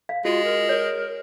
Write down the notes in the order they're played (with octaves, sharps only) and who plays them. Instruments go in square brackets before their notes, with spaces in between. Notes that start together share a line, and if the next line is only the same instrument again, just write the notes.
[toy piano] F5
[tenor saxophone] G#3 [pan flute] F4 [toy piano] F#4
[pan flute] A#4
[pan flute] A#4 [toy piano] C#5